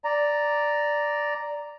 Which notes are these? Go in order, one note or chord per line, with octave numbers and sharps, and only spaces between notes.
D5 A#5